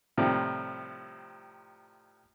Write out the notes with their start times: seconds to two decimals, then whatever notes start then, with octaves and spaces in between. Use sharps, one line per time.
0.18 A2 C3 D#3 F3 G3